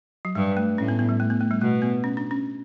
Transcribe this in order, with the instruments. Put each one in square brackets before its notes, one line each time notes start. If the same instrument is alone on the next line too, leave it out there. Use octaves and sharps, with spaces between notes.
[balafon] F#3
[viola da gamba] G2 [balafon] G3
[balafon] A3
[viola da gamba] A2 [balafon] C#4
[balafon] B3
B3
G3
A3
B3
A3
G3
[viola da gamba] B2 [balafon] A3
[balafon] B3
C#4
D4
C#4